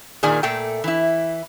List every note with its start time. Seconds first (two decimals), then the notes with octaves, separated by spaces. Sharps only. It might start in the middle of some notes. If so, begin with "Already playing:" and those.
0.23 A#2 D#3 G#4 D5 G#5
0.43 A#2 A3 A4 G5
0.84 E3 E4